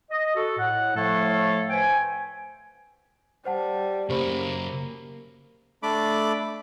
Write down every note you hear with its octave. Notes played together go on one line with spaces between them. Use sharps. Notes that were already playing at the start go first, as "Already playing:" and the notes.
D#5
F#4 A4
A2 F#5
A2 F3 A3 A4 C#5 F5
B4 C5 G5 G#5
G3 C5 F#5 A5
F#2 C#3 A#3 G4 C5 B5
A3 D4 B5 D6